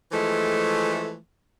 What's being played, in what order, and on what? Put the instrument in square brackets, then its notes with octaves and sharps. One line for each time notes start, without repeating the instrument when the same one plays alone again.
[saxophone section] E3 F3 G#3 A3